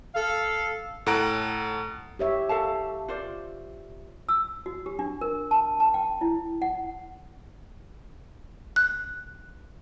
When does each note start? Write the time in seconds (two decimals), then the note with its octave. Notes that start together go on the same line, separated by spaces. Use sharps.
0.15 A4 F5
1.06 A2 A4 F#5 A#5 F#6 D7
2.19 G4 C#5 E5
2.49 A4 F5 A5
3.08 F4 C5 D5
4.29 E6
4.66 F#4
4.86 G4
4.99 D4
5.21 A#4
5.51 A5
5.80 A5
5.94 G5
6.21 E4
6.62 F#5
8.76 F#6